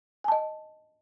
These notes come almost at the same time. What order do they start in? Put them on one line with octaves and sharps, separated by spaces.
G#5 A5 D#5